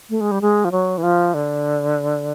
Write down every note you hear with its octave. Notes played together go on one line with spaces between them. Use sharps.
A3
G#3
G3
G#3
F3
F#3
E3
F3
D3